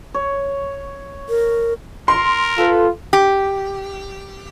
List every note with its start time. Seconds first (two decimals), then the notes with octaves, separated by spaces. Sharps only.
0.14 C#5
1.29 A#4
2.08 A#4 C6
2.58 F4 A4 B4
3.13 G4